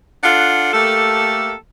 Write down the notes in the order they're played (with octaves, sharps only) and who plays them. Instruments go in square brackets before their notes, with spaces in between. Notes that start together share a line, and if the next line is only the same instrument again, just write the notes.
[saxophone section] D4 F4 A4 F#5
A3 A#3 G4 A4